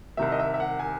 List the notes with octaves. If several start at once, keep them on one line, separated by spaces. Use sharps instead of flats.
C2 C3 D#3 E5
D#5
E5
E5
F#5
G#5